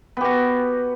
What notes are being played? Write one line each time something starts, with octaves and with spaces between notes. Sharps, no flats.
B3 F#4 G4